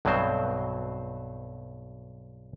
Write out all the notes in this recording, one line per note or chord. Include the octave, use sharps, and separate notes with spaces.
B1 G2 B2 F#3 C4 C5